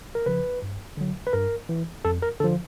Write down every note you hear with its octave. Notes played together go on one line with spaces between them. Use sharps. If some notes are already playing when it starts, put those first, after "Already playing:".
A#4
C#3 F3 B4
G2
D3 F#3
B4
G2 A#4
E3
F2 A4
A#4
D3 F3 A4